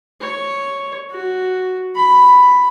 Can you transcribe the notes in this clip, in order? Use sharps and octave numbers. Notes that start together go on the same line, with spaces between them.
C#5
F#4
B5